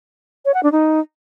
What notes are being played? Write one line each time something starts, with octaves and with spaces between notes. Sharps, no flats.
C#5
F#5
D4
D#4